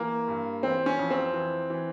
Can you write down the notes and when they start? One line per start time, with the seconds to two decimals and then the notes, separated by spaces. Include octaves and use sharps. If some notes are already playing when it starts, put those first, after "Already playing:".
Already playing: E3 A#3
0.28 G2
0.63 E3 C4
0.86 C#4
0.99 F2
1.11 C4
1.34 E3
1.70 E3